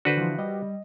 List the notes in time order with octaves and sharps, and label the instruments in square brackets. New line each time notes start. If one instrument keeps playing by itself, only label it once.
[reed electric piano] D3 D4 [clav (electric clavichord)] F#4 B4 C5
[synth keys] E3 F3
[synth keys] G3 [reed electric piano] D#5